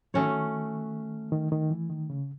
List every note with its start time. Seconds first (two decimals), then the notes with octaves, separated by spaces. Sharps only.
0.14 D#3 A3 C#4 F#4 C#5
1.32 D#3
1.52 D#3
1.71 E3
1.90 D#3
2.10 C#3